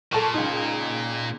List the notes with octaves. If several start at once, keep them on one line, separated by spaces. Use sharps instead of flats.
A#2 A4 A5 C#6
C#2 D#4